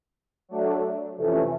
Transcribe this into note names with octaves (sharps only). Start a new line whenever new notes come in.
F#3 A3 D4
F2 C3 E3 A3 C#4